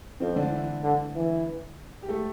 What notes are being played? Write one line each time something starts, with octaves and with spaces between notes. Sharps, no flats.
F2 C4
D3 D4
E3 E4
D3
E3
G4
A3 A4